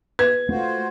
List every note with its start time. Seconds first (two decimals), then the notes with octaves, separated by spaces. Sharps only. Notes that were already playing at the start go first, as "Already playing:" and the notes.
0.19 B4 G#6
0.49 A3 F4 F#4 C5